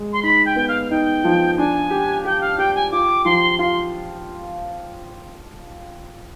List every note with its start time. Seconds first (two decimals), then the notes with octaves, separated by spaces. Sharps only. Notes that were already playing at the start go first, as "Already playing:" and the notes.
Already playing: G#3
0.13 C6
0.23 D#4 B5
0.46 G5
0.56 B3
0.68 F5
0.91 D#4 G5
1.24 F3
1.57 D4 G#5
1.91 G4
2.25 G4 G5
2.41 F5
2.58 G4 G5
2.75 G#5
2.91 F4 D6
3.25 F3 C6
3.59 F4 C6